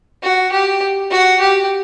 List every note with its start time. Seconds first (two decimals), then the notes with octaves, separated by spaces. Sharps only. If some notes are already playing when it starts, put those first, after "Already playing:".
0.23 F#4
0.52 G4
1.11 F#4
1.40 G4